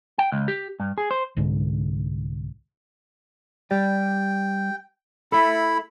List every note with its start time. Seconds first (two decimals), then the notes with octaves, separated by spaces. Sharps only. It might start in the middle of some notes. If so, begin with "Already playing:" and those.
0.18 G5
0.32 C#2
0.48 G4
0.80 G2
0.98 G#4
1.11 C5
1.37 C2 G#2 D3
3.71 G3 G4 D5 G5
5.32 E4 A4 E5 B5